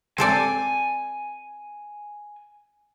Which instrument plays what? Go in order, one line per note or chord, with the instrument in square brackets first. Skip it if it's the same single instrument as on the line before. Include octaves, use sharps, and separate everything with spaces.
[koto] C4 A4 D5 [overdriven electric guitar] G#5